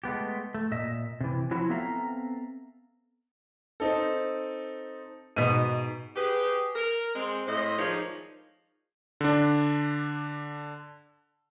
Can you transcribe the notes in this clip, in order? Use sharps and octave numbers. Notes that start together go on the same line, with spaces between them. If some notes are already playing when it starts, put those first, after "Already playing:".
G#3 A3 B3 G4
A3
A#2 D#5 E5
C3 E3
F3 F#3 E4 F#4
B3 C4 A4 E5 F5 A#5
C4 D#4 A4
G#2 B2 D#7
G4 G#4 B4
A#4
G#3 C4
A2 C5 D#5
D#3 F3 G#3 D4 D#4 C#5
D3 D4